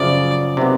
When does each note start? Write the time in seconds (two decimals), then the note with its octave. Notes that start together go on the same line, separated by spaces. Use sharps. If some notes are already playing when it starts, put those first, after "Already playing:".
Already playing: F#2 C#3 F3 D5
0.57 C3 D#3 F#3 B3